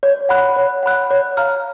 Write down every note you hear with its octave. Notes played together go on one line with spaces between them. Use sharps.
C#5
F#5 B5 F#6
C#5
F#5 B5 F#6
C#5
F5 A#5 F6